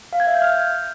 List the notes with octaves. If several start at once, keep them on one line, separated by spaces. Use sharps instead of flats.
F5
G#6
E5
G6
F6